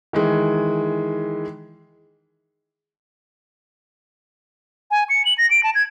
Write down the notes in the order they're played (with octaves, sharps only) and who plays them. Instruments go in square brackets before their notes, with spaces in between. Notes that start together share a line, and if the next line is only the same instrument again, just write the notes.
[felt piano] D#3 E3 G#3
[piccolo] G#5
C#7
F#7
A#6
D7
A5
G#6